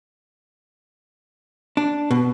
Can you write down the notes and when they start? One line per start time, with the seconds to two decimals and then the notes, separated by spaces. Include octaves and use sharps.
1.77 D4
2.11 B2